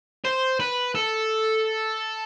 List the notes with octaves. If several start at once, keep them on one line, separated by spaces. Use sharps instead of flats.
C5
B4
A4